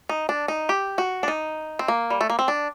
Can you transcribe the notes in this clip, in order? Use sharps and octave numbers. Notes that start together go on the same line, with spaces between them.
D#4
D4
D#4
G4
F#4
D4
D#4
C4
A#3
G3
A3
A#3
C4
D4